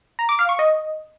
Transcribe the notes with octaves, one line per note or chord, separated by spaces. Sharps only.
A#5
D6
F5
C#6
D#5